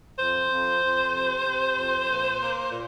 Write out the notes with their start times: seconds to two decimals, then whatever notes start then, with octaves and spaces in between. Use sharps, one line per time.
0.19 F2 C5
0.50 F2
0.82 F2
1.14 C3
1.46 C3
1.77 F2
2.09 A#2
2.39 A#3
2.71 A#2